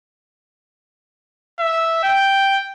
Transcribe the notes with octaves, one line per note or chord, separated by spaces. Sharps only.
E5
G5